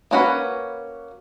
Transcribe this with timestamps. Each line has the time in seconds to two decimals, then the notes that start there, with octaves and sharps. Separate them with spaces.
0.11 A#3 C#4 F#4 B4